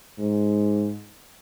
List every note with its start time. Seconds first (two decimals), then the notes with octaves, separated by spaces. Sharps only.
0.19 G#2